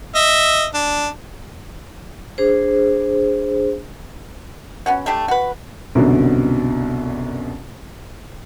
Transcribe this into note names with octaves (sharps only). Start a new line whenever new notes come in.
D#5 E5
D4
D4 G#4 C5
B3 C#4 F#4
A3 D4 G4
F#4 B4
C2 F#2 B2 D3